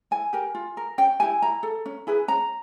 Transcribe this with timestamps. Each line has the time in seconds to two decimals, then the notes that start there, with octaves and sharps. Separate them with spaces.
0.11 E4 G#5
0.33 G4 A#4
0.55 F4
0.77 A#4
0.98 C#4 G5
1.20 E4 G4 G#5
1.42 E4 A#5
1.63 A4
1.86 C#4
2.07 E4 G#4 B4
2.28 C#4 A#5